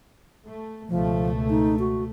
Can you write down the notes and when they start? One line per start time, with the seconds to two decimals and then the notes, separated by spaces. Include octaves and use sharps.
0.46 A3
0.89 C#2 B2 F3 A3
1.50 D#4
1.79 F#4